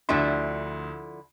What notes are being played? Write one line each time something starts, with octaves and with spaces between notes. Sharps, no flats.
D2 D3 F3 E4 C6